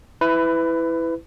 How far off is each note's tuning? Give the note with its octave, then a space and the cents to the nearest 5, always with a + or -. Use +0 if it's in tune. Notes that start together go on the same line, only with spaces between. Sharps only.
E4 +0 B4 +20